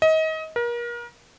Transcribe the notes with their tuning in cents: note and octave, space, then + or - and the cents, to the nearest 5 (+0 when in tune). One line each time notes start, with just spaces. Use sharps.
D#5 +30
A#4 +35